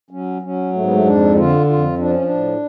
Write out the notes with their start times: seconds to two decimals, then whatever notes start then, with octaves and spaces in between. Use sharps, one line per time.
0.11 F#3 C#4
0.42 F#3 C#4
0.73 G#2 A3
0.83 B3
0.92 A3
1.05 F2 D4
1.36 D3 F4
1.67 F2 F4
1.98 F3 D4
2.11 C#4
2.22 D4
2.29 A2